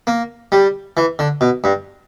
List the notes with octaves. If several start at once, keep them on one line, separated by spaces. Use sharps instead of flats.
A#3
G3
E3
D3
B2
G2